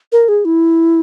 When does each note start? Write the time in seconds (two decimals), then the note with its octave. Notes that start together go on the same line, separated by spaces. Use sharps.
0.12 A#4
0.29 G#4
0.45 E4